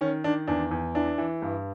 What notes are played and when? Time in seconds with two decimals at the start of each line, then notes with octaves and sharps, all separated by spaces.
0.01 D#3 C#4
0.24 D#3 D4
0.47 E2 D4
0.71 E2
0.95 E3 D4
1.18 E3
1.42 G2